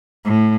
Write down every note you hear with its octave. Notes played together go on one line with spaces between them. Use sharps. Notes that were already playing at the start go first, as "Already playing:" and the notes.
A2